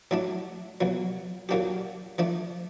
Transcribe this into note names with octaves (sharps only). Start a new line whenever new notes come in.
A2 F#3 A3 D4
B1 A#2 F#3
A#2 F#3 A#3 D4 G4
F3 A3 D4